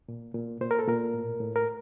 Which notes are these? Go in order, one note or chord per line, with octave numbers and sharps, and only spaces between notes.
A#2
A#2
A#2 C5
A#4
A4
A#2 A#4
A2
A2
A#4